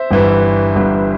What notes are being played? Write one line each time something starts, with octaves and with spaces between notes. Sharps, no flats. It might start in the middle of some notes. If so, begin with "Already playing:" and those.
Already playing: C5 E5
G1 G2 E3
G1 G2 E3